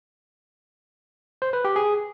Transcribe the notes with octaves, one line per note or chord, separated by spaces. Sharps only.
C5
B4
G4
G#4